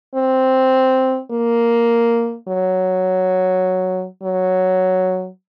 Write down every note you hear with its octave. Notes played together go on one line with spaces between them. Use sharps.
C4
A#3
F#3
F#3